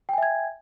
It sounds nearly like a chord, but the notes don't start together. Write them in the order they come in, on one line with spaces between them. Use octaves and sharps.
G5 G#5 E5 G#6